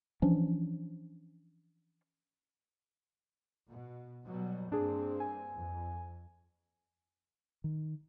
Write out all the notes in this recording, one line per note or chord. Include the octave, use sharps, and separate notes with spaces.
E3 F3 C#4 D4
B2
B2 F#3 G3
G2 A#3 C4 D4 G#4
G#5
F2
D#3